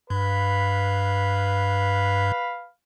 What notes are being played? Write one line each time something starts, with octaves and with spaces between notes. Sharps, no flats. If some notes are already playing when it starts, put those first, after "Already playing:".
G2 B4 F5 B5